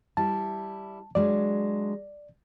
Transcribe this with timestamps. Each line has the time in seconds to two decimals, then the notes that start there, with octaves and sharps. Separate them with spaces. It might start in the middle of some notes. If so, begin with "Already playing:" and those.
0.17 G3 E4 A5
1.15 F#3 G#3 D4 D5